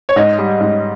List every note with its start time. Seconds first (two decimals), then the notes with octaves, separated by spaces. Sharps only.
0.09 C#5
0.16 G#2 D#5
0.39 G3
0.60 G#2